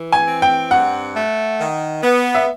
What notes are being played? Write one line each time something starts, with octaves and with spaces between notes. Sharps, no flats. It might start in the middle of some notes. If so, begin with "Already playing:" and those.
Already playing: E3
G#5
C4
G5
G2 F#5
A3
D#3
B3
E5